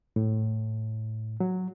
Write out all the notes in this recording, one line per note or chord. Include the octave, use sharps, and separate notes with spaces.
A2
F#3